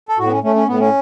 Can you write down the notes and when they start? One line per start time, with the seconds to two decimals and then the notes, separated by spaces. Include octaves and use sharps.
0.09 A4
0.18 A2 F#4
0.26 B3
0.32 C#4
0.43 A3 C#4
0.56 C#4
0.67 A2 B3
0.79 C#4